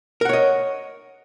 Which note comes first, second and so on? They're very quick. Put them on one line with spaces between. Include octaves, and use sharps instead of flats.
A#4 F#5 C#5 D#5